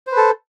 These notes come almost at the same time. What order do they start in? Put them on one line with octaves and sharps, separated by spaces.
C5 B4 A4